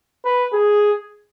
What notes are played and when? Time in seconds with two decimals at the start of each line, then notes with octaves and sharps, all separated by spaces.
0.25 B4
0.53 G#4